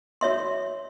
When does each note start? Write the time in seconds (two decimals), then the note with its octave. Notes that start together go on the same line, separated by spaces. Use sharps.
0.21 F#4 C#5 E5 C6